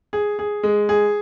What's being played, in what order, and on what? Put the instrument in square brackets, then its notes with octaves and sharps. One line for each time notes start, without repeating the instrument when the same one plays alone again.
[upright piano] G#4
G#4
G#3
G#4